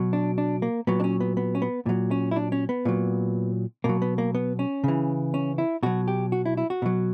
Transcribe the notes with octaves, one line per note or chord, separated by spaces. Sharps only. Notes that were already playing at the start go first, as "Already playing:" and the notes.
Already playing: B2 F#3
D4
D4
A#3
A#2 F#3 B3
D4
C#4
B3
B3
C#4
B3
A#2 F#3
C#4
E4
D4
C#4
B3
A#2 F#3
B2 F#3 A#3
B3
A#3
B3
C#4
C#3 E3
C#4
E4
B2 F#3 F#4
G4
F#4
E4
E4
F#4
B2 F#3